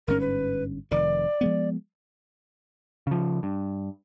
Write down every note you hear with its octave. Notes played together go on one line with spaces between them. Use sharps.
G1 G#2 C#4 A#4
B4
F1 D#3 D5
F3 G#3 B3
C#3 F3
G2